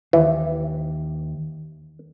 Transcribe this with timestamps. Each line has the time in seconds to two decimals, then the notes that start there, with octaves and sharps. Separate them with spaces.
0.13 D#2 E3